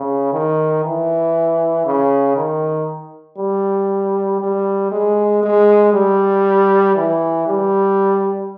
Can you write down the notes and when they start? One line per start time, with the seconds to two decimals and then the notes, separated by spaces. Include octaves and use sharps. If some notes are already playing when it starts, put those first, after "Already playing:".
Already playing: C#3
0.33 D#3
0.84 E3
1.86 C#3
2.37 D#3
3.38 G3
4.41 G3
4.92 G#3
5.43 G#3
5.93 G3
6.96 E3
7.47 G3